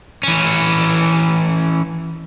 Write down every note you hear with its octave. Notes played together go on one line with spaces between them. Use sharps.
E3 C#4